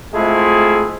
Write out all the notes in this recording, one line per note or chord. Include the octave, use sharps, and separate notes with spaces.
G#3 A3 C4 E4 F4 G#4